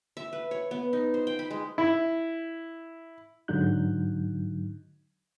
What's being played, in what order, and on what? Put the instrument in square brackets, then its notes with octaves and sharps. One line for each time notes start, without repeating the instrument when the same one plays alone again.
[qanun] E5
B4
C#5
B3
D#4
C5
G5
B5
G#3
[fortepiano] E4
[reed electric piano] G#2 D3 F#3 D#4 F#6 G6